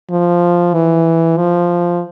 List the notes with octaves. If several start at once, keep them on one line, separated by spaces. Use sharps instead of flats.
F3
E3
F3